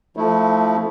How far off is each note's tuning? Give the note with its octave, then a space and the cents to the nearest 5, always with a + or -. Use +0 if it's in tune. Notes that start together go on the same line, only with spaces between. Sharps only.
F3 -10 A3 +0 E4 -25